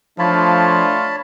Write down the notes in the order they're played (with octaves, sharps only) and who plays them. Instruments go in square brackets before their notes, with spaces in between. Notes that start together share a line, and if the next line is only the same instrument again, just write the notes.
[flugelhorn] F3 [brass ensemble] A3 D4 [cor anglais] F4 [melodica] C#5 A5 B5